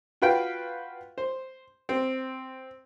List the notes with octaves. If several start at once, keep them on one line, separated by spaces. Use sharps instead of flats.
F4 F#4 B4 F5 G5
C5
C4